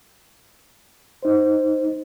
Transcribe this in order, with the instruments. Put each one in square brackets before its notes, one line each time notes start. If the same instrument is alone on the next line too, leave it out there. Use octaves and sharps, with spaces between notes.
[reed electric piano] D#4 C5